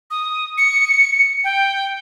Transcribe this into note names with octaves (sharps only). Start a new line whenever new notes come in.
D#6
C#7
G5